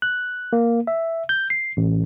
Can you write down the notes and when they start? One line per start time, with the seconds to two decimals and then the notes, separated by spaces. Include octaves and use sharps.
0.02 F#6
0.53 A#3
0.87 E5
1.29 G6
1.50 C7
1.77 A1